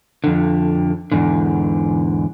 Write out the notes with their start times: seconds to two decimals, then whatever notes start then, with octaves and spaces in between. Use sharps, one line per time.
0.24 F2 D3
1.12 E2 G#2 D3